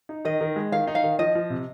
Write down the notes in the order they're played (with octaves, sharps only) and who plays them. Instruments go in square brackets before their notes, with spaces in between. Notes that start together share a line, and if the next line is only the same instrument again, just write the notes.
[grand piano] D#4
[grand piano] D#3 [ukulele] D#5
[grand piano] D#3
G#3
[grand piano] D#3 [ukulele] F5
[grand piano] D#4
[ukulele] F5
[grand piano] D#3
[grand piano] F3 [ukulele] D#5
[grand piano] F3
C3